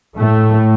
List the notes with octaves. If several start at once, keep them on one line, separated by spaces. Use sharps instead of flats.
A2 A3